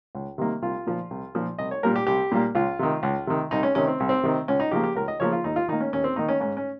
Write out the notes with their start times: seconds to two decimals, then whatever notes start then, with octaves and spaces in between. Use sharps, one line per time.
0.15 C#2
0.38 C3 D#3 G3 A#3
0.62 C2 F4
0.87 A#2 F3
1.11 C2
1.35 A#2 F3
1.58 C2 D#5
1.71 C#5
1.83 A#2 G3 A#3 A#4
1.96 G4
2.07 C2 G4
2.32 A#2 G3 A#3
2.55 C#2 F4
2.79 C3 D#3
3.03 C#2
3.27 C3 D#3
3.51 C2 D#4
3.63 C#4
3.75 C3 D#3 C#4
3.88 C4
4.00 C2
4.09 C4
4.23 C3 D#3
4.48 C#2 C#4
4.60 D#4
4.71 C#3 F3 A#3 G4
4.84 G4
4.96 C#2 A#4
5.08 D#5
5.20 C#3 F3 A#3 C#5
5.32 F4
5.44 D#2 D#4
5.56 F4
5.68 D#3 D#4
5.73 A#3
5.81 C#4
5.93 D#2 C#4
6.04 C4
6.16 D#3 A#3 D#4
6.29 C#4
6.40 G#2 C#4
6.57 C#4